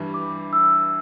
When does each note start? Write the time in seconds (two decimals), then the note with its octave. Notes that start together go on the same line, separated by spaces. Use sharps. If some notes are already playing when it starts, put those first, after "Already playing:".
Already playing: G2 E3 G3
0.14 D6
0.53 E6